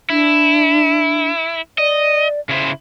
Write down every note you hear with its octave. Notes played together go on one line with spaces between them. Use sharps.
D4 E4
D5 D#5
C#3 E4 C5